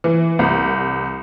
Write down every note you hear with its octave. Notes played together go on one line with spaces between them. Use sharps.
E3
C2